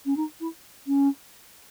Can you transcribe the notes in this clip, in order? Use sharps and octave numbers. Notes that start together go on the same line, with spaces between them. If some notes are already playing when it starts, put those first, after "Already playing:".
C#4
D#4
E4
C#4